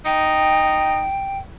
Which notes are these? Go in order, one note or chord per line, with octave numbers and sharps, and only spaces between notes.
D#4 G5